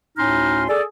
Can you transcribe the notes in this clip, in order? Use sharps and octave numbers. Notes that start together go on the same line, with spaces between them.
D2 A2 C#4 D#4 C6 F6
G#4 A4 D5